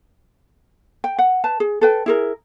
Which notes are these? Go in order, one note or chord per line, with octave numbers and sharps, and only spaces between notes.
G5
F#5
B4 A5
G#4
A4 B4 G5
E4 G#4 A#4